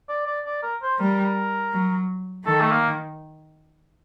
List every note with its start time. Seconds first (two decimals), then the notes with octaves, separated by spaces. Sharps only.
0.09 D5
0.27 D5
0.46 D5
0.63 A#4
0.82 C5
0.99 G3 A#4
1.73 F#3
2.47 D#3 A4
2.61 A3
2.71 A#3